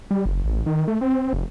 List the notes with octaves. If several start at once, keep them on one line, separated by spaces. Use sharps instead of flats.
G3
F#1
A1
D#3
A3
C4
F1